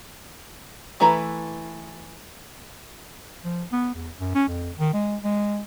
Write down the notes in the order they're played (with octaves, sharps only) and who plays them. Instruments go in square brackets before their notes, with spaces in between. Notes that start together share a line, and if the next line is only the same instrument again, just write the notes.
[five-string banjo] E3 A3 E4 B4 A#5
[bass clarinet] F3
B3
E2
F#2
C#4
F2
D#3
G#3
G#3